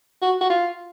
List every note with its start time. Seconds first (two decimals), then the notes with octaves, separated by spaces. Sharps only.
0.22 F#4
0.41 F#4
0.50 F4